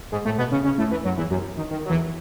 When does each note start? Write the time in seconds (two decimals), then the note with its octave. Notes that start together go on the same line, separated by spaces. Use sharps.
0.12 G#2 G#3
0.25 A2 A3
0.38 B2 B3
0.51 C#3 C#4
0.64 C#3 C#4
0.78 A2 A3
0.91 E2 E3
1.04 F#2 F#3
1.17 E2 E3
1.30 F#2 F#3
1.57 D#3
1.70 D#3
1.85 F#3
1.89 E2 E3